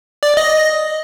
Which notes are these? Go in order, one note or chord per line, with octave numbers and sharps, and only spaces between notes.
D5
D#5